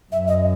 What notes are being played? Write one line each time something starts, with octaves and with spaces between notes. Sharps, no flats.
F#2 E5
D#5